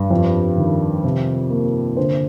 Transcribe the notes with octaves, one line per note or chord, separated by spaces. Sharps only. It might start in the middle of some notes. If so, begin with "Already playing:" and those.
Already playing: G2
F2
D#3
C3
A#3
D3 C5